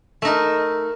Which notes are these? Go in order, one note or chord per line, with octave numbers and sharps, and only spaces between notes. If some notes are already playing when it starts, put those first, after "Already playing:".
A3 D#4 A#4